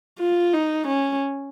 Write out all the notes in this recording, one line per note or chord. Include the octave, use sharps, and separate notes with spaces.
F4
D#4
C#4